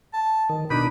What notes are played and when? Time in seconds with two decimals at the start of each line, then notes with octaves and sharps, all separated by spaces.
0.14 A5
0.49 D#3
0.70 B2 D4 D#4 B5